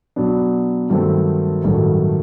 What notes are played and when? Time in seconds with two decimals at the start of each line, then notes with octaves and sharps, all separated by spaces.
0.16 B2 F#3 B3 D4
0.90 G2 D#3 F#3 A3 C4
1.64 A1 G2 D#3 F#3 A3